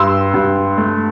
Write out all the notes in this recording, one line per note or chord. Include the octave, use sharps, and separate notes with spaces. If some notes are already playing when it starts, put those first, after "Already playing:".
Already playing: G2 C6 E6
G2
A3